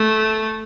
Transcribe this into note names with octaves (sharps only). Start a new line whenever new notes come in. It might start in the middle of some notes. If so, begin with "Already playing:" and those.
Already playing: A3